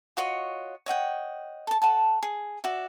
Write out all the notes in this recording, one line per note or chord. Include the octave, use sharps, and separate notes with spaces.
F4 F#4 C#5 D#5
C#5 D#5 F#5 G5
A4 A5
A4 F#5 A5
G#4
F#4 D5 E5